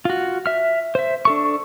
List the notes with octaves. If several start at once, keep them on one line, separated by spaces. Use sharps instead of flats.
F4 F#4
E5 F6
C5 E5
D4 A4 C#6